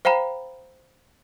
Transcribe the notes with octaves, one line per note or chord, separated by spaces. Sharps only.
C5 F5 G5 A#5 B5